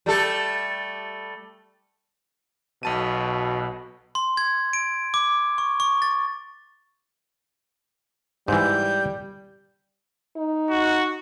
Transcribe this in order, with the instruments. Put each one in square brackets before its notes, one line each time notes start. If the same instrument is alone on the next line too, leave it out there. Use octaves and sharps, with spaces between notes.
[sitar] G3 A3 A4
[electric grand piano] B1 A5 D#7 [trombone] B2
[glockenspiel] C6
G#6
D7
D6
C#6
C#6
A6
[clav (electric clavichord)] G#2 E3 [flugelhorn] G3 [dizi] G6
[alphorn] D#4
[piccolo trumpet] F#4